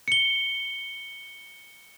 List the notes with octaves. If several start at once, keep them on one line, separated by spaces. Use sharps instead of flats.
C#7 G7